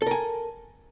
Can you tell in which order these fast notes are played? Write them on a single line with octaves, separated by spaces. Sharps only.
A4 A#4 G#5